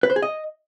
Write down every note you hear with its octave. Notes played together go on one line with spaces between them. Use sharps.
B4
C5
G#4
D#5